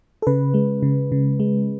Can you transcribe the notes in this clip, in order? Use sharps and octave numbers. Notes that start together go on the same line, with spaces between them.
A4
C#3 B4
G#3
C#3
C#3
G#3